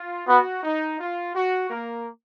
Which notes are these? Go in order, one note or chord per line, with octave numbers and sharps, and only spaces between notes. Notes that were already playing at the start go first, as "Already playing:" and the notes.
Already playing: F4
B3 F#4
D#4
F4
F#4
A#3 A#4